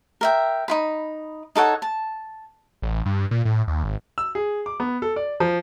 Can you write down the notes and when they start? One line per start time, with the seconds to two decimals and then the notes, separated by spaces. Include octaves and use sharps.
0.21 A#4 E5 G5
0.68 D#4 F4 B5
1.55 D#4 A4 C#5 F#5
1.82 A5
2.82 A1
3.06 G2
3.31 A#2
3.45 A2
3.68 D#2
3.84 G#1
4.18 E6
4.35 G#4
4.66 D6
4.80 B3
5.02 A4
5.16 D5
5.40 F3